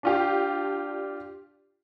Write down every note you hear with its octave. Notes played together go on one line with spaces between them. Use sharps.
D4 F4 G4